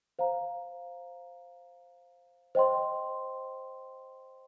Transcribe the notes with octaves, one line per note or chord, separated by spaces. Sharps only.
C5 F5 A#5
C5 D#5 G5 C6